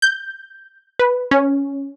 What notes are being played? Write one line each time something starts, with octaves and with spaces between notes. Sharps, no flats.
G6
B4
C#4